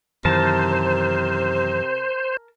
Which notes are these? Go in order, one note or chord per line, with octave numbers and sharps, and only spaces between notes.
F#2 C3 D#3 E3 A#4 C5 A5